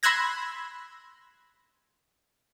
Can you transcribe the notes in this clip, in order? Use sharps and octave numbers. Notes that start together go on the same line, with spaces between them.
B5 C6 E6 F#6 G#6 A#6